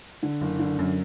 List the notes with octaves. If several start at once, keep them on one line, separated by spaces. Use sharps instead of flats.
D3
F#1
D3
F#2